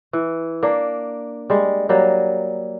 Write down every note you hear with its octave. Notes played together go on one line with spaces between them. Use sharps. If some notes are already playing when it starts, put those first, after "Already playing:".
E3
A#3 D4
G3 G#3
F#3 G3 A#3